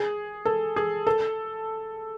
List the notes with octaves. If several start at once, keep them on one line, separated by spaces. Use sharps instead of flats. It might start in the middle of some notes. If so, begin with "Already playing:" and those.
Already playing: G#4
A4
G#4
A4